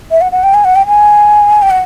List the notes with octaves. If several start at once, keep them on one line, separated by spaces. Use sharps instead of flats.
E5
F#5
F#5
G5
G#5
F#5
G5
G#5
G5
F#5